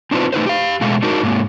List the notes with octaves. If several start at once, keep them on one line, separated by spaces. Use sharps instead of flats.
C4 D4 D#4 F4 B4 C5
A3 D#4 B4 C5
G4 F5
B2 G#3 A3 F5
D4 D#4 F#4 A#4
G#2 A#3